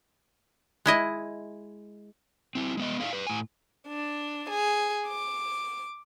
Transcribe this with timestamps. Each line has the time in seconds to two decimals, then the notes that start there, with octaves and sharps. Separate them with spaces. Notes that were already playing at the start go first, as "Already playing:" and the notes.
0.86 G#3 E4 D#5
2.55 C4 E4
2.77 G#3 B3 D#5
3.01 D#4 E4 A4 B4 D5 F5
3.13 B4 D5
3.27 A2 G#5
3.88 D4
4.50 G#4
5.07 D6